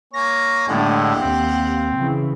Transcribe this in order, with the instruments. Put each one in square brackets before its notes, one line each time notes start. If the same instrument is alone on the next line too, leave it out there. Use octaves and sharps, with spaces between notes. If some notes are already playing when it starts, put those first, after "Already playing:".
[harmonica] A#3 C#5 G#5 [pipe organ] A#6
[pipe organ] A2 D3 G#3 [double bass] A3 D4 [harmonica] G4 F5 F#5
[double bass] D#2 [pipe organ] C4
[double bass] C#3 E3